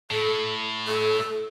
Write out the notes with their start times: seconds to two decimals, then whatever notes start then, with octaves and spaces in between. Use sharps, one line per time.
0.11 A2 A4
0.88 A4